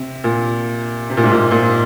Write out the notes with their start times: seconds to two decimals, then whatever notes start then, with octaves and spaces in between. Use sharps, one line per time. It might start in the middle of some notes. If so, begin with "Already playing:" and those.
Already playing: C3
0.24 A#2
1.10 C3
1.17 A#2
1.24 G#2
1.32 A#2
1.51 A#2